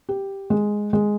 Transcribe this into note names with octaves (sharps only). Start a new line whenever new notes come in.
G4
G#3
G#3